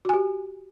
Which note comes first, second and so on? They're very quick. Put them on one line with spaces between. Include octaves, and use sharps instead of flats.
F#4 G#5 G4